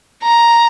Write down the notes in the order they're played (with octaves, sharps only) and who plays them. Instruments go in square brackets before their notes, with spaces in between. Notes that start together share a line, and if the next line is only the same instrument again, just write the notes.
[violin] A#5